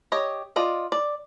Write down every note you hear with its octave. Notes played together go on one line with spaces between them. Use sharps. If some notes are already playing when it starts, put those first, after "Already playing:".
G4 C#5 D#5
F4 D5 D#5
D5